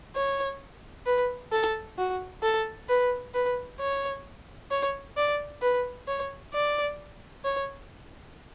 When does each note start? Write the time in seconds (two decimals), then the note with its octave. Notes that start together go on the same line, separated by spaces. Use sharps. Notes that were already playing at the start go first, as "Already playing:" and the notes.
0.15 C#5
1.06 B4
1.52 A4
1.98 F#4
2.43 A4
2.89 B4
3.34 B4
3.80 C#5
4.71 C#5
5.17 D5
5.62 B4
6.08 C#5
6.53 D5
7.45 C#5